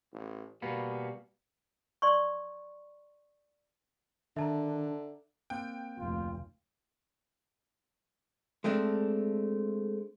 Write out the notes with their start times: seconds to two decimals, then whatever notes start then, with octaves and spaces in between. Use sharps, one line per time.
0.13 A1
0.62 B2 G3 A#3 B3
2.02 D5 C6 C#6
4.36 D3 D#3 D4 E5 A5 A#5
5.50 A#3 C4 G5 F#6
5.99 F1 D2 F4
8.64 G#3 A3 C4 D4